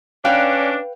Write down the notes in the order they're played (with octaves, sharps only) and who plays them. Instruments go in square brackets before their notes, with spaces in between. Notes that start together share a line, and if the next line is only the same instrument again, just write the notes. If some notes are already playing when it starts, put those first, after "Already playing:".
[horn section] C#4 D4 [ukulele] B4 F5 G5